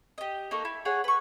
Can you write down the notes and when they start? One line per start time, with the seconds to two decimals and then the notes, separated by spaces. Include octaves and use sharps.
0.18 G4 D#5
0.51 A#3 D#4 A4 C#6
0.65 E4
0.85 G#4 C#5 F#5 G#5
1.04 B4 C#6